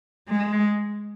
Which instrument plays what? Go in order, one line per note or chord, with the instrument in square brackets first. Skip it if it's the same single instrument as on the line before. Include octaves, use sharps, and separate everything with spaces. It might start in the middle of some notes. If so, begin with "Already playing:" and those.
[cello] G#3